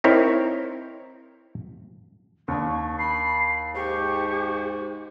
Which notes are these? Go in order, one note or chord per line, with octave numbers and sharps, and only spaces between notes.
C4 D#4 E4 A#4 C#5
D#2 D4 C#6
B5 C7
G#2 G4 C#6